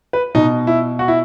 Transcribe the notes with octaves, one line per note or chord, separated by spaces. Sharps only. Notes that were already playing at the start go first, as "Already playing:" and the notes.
B4
B2 D#4
E4
F#4
E4